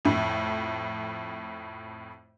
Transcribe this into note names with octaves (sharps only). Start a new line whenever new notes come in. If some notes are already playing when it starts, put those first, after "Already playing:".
F2 A2